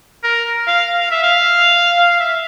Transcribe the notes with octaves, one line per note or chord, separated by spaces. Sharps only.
A#4
F5
F5
E5
F5
F5
E5